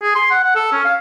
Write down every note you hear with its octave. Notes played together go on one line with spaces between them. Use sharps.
G#4
C6
F#5
F#5
A4
C#4
F5